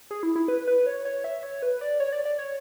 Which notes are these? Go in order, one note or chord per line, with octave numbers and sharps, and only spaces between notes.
G#4
E4
E4
B4
B4
C#5
C#5
E5
C#5
B4
D5
C#5
D5
D5
C#5